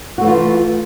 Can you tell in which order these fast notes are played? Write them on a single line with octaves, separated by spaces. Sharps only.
F#4 A3 E3 F4